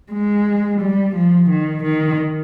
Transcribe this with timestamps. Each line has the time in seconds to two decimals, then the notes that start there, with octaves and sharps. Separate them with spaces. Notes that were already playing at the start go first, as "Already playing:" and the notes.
0.12 G#3
0.81 G3
1.15 F3
1.50 D#3
1.84 D#3